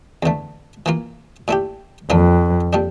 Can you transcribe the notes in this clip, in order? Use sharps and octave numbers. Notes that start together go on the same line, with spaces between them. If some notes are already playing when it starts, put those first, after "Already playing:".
E2 D3 A3
E3 A#3 F4
A#2 A3 E4 G4
F2 E3 A#3 D4 F4
A#2 G3 D4